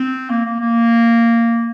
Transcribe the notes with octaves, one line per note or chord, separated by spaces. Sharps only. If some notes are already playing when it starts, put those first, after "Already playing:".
Already playing: C4
A#3
A#3
A#3